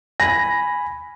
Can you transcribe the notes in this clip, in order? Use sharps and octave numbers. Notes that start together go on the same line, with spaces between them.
G#5 B5 A#6